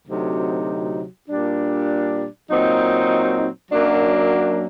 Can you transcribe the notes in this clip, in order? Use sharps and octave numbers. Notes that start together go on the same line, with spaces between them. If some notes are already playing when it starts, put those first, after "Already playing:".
D2 C3 F#3 C4 D#4
A#2 G3 D4
A#2 F#3 C4 D#4
F#2 F#3 A#3 D4